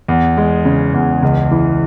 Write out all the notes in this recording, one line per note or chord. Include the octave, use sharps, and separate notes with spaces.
E2
G#3
C#3
E2
C#2
E3